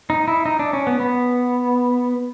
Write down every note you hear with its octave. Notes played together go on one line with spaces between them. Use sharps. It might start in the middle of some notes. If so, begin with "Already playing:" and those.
D#4
E4
D#4
D4
C#4
B3
B3